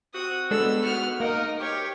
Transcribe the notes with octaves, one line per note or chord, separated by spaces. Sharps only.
C4 F#4 D#6
G#3 B3 D4 A4 E6
G#2 B3 F#4 F6
A#3 D#4 A#4 D#5
G4 C#5